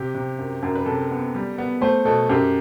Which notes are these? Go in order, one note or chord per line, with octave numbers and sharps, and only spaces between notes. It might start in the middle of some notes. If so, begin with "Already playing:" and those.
Already playing: C3 G4
C3
F#2
F#2
B4
C3 A4
B3
G3
B3
A3 C5
B2 A4
F#2 G4